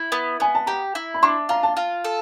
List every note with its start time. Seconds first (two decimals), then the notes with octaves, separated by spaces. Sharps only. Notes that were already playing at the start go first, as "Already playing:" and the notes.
Already playing: E4
0.12 B3
0.40 B3 G#5
0.55 A5
0.67 G4 A#5
0.95 E4
1.14 B5
1.23 D4 C6
1.49 F4 A#5
1.63 A5
1.77 F4
2.04 A4